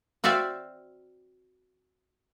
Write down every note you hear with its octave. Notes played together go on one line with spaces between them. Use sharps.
C4 F#4 D5 E5 F5